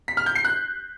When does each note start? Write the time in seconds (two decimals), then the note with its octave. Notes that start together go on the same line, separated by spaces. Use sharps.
0.08 B6
0.17 F6
0.26 G6
0.35 C7
0.45 F#6